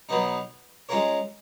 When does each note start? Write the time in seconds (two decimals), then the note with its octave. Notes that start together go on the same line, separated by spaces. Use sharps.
0.09 B2 F#3 B3 D#4
0.89 G#3 C#4 F4 A#4 C#5